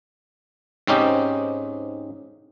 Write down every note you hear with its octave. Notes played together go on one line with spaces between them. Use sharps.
G#2 C4 C#4 D#4 G4